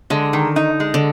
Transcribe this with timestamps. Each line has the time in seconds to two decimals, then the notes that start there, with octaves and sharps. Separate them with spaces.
0.10 D3 G#3
0.33 D#3
0.56 D#4
0.80 G#3
0.94 D3